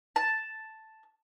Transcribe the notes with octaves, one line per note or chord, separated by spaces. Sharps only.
A5